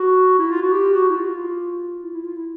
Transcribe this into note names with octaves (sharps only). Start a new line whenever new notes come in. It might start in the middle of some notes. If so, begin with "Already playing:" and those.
Already playing: F#4
E4
F4
F#4
G4
F#4
E4
F4
E4
E4
F4
E4